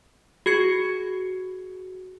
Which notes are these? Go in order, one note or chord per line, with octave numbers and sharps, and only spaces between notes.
F#4 G#4 G#6 C#7